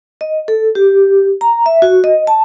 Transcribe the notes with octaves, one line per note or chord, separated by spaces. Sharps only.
D#5
A4
G4
A#5
E5
F#4
D#5
A5